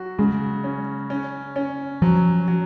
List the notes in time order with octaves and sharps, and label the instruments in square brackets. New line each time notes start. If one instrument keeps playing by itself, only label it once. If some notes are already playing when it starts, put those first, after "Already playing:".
Already playing: [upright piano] F#3 F#4
[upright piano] C#3 [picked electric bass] G#3
[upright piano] C#4
C#4
C#4
[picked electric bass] F3 [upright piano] F#3
[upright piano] F#3